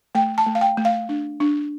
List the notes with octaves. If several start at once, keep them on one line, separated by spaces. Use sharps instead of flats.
A3 G5
A5
A3
F5
G5
A3
F5
D4
D4